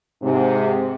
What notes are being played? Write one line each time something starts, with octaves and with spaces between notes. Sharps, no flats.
G#2 C3